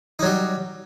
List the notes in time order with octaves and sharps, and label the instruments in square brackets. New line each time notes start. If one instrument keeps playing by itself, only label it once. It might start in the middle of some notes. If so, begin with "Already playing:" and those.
[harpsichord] D#4
F#3
G3